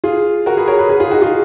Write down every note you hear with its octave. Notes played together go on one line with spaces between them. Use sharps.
F4 G#4
F#4 A#4
G#4 B4
A#4 C#5
G#4 B4
G#4 B4
F4 G#4
D#4 F#4
F4 G#4